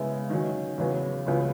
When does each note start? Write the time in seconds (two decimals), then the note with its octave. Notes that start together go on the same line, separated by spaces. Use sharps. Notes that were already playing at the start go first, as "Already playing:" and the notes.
Already playing: C#3 G#3 B3 E4
0.30 D#3 F#3 C#4
0.78 E2 C#3 F#3 B3 F#4
1.27 C#2 C#3 F#3 B3